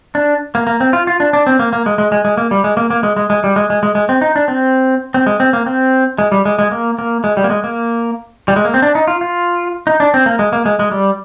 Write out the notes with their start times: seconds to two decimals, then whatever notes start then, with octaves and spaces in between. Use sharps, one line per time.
0.15 D4
0.55 A#3
0.67 A#3
0.81 C4
0.93 F4
1.07 F4
1.20 D4
1.33 D4
1.47 C4
1.59 A#3
1.73 A#3
1.86 G#3
1.98 G#3
2.12 G#3
2.25 G#3
2.37 A#3
2.51 G3
2.64 G#3
2.77 A#3
2.91 A#3
3.03 G#3
3.17 G#3
3.30 G#3
3.44 G3
3.56 G#3
3.70 G#3
3.83 G#3
3.95 G#3
4.09 C4
4.21 D#4
4.36 D4
4.48 C4
5.14 C4
5.27 G#3
5.40 C4
5.53 A#3
5.66 C4
6.18 G#3
6.32 G3
6.45 G#3
6.59 G#3
6.72 A#3
6.99 A#3
7.24 G#3
7.37 G3
7.44 A#3
7.50 G#3
7.64 A#3
8.48 G3
8.56 G#3
8.65 A#3
8.74 C4
8.82 D4
8.95 D#4
9.08 F4
9.21 F4
9.87 D#4
10.00 D4
10.14 C4
10.26 A#3
10.39 G#3
10.53 A#3
10.66 G#3
10.79 G#3
10.91 G3